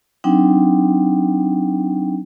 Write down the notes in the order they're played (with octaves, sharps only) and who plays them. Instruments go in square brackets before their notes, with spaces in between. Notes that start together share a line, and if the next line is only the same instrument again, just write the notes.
[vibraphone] F#3 C4 D4 D#4 G5